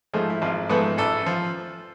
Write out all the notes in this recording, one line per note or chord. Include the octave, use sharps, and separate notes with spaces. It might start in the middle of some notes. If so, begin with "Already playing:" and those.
G#2 F3 G#3 A3 G#4
E4
G#1 F3 F4
G#2 F3 A3 B3 B4
A1 A3 A4
F3